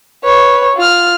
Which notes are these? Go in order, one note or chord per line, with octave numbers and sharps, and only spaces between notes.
B4 C#5
F4 F6